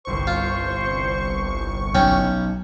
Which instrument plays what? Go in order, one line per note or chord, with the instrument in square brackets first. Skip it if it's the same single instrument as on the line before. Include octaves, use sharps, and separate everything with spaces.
[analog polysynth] G1 C2 C#6 [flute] C5
[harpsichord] F4
[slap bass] B1 [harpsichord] C#4 G5